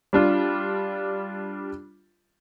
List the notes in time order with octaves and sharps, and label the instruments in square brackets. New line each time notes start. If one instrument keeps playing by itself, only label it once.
[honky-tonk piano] G3 D4 F4